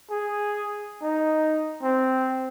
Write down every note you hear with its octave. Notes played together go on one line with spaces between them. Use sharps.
G#4
D#4
C4